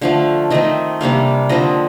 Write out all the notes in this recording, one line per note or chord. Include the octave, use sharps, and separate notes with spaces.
D3 F3 A3 F5
D#3 A3 C4 D#5
C3 G3 A#3 D4 F5
D3 F3 C4 D#5